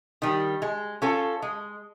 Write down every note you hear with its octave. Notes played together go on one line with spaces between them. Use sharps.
D#3 G3
G#3
C#4 F4 A4
G#3